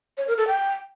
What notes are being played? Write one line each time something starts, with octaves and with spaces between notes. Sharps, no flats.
C#5
A#4
A4
G5